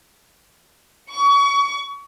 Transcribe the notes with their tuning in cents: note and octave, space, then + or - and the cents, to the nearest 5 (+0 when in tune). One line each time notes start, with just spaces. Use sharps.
C#6 +30